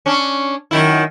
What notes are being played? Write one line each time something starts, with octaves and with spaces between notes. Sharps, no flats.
C#4 D4
F#2 D#3 E4